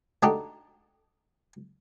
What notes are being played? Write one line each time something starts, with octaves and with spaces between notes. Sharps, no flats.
A3 D4 D#4 F#4 G4